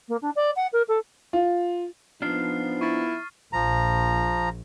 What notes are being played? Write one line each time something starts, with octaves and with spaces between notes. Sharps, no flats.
A#3
D4
D5
F#5
A#4
A4
F4
F3 B3 D4 D#4 F4 F6 C7
E4 C#6 A6
A#1 F3 A#5